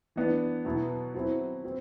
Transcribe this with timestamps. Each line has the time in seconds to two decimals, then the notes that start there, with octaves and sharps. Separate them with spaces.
0.16 E3 B3 D4
0.65 B2 F#3 B3 E4
1.14 F#3 C4 E4
1.64 F#3 C4